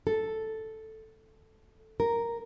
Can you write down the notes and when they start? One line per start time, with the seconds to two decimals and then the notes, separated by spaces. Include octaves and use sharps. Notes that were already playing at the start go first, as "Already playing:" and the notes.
0.07 A4
2.00 A#4